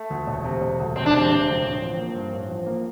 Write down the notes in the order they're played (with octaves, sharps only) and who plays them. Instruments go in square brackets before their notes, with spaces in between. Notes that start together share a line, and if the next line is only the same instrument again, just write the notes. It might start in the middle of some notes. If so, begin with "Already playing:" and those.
Already playing: [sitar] A3
[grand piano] D2
E1
C3
E1
D2
[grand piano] E1 [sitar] C4
[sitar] D4
[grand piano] C3 [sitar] C4
[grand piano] E1
D2
A1
F3
A#3
G2
A1
F3
A#3